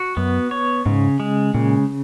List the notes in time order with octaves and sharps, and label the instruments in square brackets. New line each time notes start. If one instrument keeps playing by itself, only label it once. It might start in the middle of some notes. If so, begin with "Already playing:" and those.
Already playing: [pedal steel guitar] F#4
[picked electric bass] F#2 [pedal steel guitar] B3
[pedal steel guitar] C#5
[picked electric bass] G#2 [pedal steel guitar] C#3
[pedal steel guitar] G#3
[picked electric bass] A#2 [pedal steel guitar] C#3